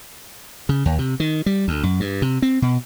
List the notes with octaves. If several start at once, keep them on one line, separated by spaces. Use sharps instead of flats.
C#3
D#2
C3
D#3
G3
D2
F#2
G2
C3
C4
B2